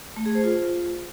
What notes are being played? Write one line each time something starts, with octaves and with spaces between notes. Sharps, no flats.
A3
G#4
C5
F4